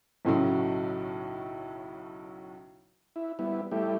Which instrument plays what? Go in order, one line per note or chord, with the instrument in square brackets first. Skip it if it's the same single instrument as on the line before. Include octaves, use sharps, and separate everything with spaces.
[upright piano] B1 A2 C#3 F#3
[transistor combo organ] E4
G3 B3 E4
G3 A3 E4 G4